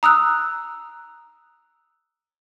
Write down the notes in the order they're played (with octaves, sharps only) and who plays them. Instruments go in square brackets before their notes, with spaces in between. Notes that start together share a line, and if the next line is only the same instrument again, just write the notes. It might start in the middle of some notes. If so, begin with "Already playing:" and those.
[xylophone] A#5 D#6 E6 F#6